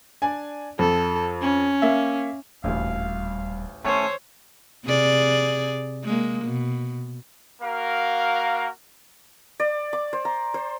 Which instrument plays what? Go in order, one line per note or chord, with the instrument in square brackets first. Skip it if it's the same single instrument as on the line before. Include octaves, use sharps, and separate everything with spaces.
[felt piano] D4 D5 G#5
[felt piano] F2 [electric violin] A4
[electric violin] C#4
[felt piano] A#3 E5
[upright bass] D#1 G3 [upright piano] A1 D2 [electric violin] F5
[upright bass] D#3 [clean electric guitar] A3 C#4 [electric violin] C5 C#5
[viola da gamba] C3 G#4 D5
G#3 A#3
B2
[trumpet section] A#3 F#4 A#4 F5
[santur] D5
D6
C5
A#5
C5